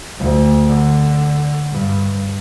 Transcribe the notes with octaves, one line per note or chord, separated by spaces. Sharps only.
D2
D3
G2